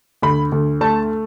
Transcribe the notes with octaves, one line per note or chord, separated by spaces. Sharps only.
D2 B5
D2
A3 A5